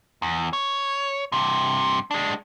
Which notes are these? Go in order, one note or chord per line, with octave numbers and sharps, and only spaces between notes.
E2
C#5
G2 C3
G#3 D4